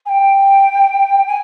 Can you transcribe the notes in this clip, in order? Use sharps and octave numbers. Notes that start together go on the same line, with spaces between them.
G#5
G5
G#5